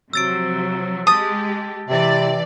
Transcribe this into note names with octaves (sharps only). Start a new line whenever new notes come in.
C3 F3 F#3 E6 A6 D7
G#3 G4 A5 D#6 A6
C3 E3 D5